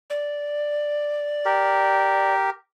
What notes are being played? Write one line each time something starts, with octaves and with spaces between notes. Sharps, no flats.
D5
G4 A#4